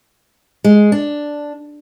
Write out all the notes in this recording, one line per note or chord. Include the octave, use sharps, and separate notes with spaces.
G#3
D4